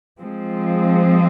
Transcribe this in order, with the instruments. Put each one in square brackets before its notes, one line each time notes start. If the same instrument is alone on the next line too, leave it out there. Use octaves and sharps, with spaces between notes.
[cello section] F3 G#3 C4